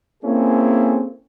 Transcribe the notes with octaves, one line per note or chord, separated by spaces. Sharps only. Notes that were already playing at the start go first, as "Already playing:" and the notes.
A#3 C4 C#4 E4 G#4 A4